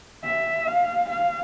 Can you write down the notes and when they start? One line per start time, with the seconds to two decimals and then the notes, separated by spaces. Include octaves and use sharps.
0.24 E5
0.67 F5
1.09 F5